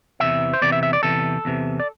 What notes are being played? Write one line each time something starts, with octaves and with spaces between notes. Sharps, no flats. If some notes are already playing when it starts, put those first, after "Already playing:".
E2 C3 E3 E5
C5
E2 C3 E3 D5
E5
E5
D5
E2 C3 E3 A4
E2 C3 E3
D5